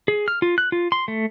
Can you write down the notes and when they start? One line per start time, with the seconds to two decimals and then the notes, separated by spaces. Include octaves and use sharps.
0.08 G#4
0.28 F6
0.42 F4
0.58 F#6
0.72 F4
0.92 C6
1.08 A3